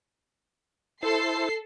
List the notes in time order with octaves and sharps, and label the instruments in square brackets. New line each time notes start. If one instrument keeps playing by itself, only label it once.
[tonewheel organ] E4 C5 A5 [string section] A4 C7